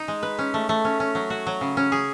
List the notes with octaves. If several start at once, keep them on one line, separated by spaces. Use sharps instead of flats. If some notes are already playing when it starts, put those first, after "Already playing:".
Already playing: D#4
G#3
B4
C#4
A3
A3
C#4
C#4
F#3
F#4
F#3
C#3
C#4
G#4